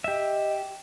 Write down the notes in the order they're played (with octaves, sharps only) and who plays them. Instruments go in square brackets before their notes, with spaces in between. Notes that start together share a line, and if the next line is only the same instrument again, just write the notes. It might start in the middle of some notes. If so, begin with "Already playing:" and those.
[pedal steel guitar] G4 E5 [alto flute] D#5